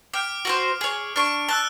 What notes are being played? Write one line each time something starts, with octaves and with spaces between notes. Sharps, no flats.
G5 D6 F6 D7
F#4 A#4 C5
G#4 C#5
D4 C#6 F6 D7
A5 E6 F#6 G7